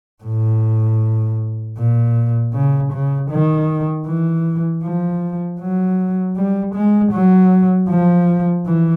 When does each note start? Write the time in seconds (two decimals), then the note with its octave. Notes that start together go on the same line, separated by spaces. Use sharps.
0.24 A2
1.78 A#2
2.54 C#3
2.92 C#3
3.31 D#3
4.06 E3
4.83 F3
5.60 F#3
6.36 G3
6.75 G#3
7.13 F#3
7.90 F3
8.66 E3